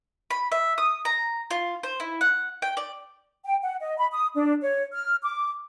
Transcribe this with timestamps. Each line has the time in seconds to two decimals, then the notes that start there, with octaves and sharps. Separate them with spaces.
0.31 B5
0.52 E5
0.78 D#6
1.05 A#5
1.51 F4
1.83 C5
2.00 E4
2.21 F#5
2.62 G5
2.77 D5
3.46 G5
3.63 F#5
3.82 D#5
3.98 B5
4.13 D#6
4.35 D4
4.62 C#5
4.94 F6
5.23 D6